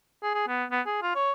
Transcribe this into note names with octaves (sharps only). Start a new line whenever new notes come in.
G#4
G#4
B3
B3
G#4
F4
C#5